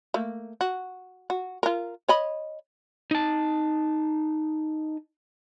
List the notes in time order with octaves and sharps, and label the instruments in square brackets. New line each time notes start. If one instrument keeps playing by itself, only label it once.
[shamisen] A3 A#3
F#4
F#4
F4 A#4
C#5 D#5 B5
[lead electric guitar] D#4 A5